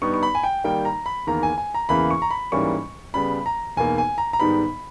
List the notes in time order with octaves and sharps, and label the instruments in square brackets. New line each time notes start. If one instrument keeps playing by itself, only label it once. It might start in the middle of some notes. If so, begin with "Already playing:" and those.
[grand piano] G2 G3 B3 D#4 C#6
C#6
B5
G#5
G5
D#3 G3 A#3 D#4 G5
A#5
B5
E2 D#3 A#3 A#5
G#5
G#5
A#5
E2 C#3 E3 A#3 B5
C#6
A#5
B5
G#2 E3 G3 A#3 C#4 C#6
C#3 G3 B3 B5
A#5
E2 B2 A#3 D#4 G#5
G#5
A#5
A#5
G#2 D#3 G3 B3 D#4 B5